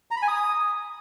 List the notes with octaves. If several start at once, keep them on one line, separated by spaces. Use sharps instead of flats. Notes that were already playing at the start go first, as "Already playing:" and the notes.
A#5
B5
G#5
D#6